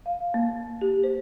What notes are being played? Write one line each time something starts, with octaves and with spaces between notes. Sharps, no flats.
F5
A#3
G4
C5